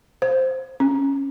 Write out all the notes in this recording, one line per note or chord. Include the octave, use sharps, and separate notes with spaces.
C5
C#4